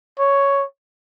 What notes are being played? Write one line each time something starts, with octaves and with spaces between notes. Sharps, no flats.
C#5